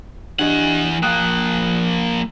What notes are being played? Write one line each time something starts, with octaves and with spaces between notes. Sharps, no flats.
E3 D4 G4 D#5 F#5
F3 A#3 G5 D#6 F#6